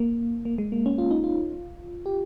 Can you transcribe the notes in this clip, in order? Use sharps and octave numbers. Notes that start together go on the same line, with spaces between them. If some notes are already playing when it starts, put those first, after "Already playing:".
Already playing: A#3
A#3
G#3
A#3
C#4
F4
D#4
F4
G4